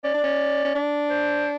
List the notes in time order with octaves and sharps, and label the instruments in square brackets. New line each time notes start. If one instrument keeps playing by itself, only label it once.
[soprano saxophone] C#4 [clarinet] D5
[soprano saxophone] D4
C#4
C#4
D4
[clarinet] C5